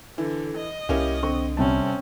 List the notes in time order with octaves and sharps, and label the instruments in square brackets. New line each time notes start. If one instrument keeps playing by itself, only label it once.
[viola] D3 [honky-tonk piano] E3
[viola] D#5
[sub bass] C2 [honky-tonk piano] A#3 C#4 E4 [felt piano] G4
[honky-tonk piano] D3 [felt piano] C4 C#6
[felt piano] C3 G3 A5 [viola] C4 C#4